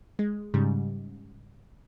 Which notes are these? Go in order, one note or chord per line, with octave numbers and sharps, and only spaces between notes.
G#3
G#2 C#3 G3